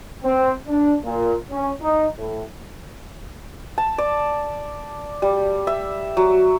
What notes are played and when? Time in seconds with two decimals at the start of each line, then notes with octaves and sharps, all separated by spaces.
0.24 C4
0.67 D4
1.04 A#2
1.51 C#4
1.81 D#4
2.18 A2
3.78 A5
3.98 D5
5.22 G3
5.67 E5
6.17 F#3